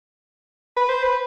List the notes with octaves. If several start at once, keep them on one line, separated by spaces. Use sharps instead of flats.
B4
C5
B4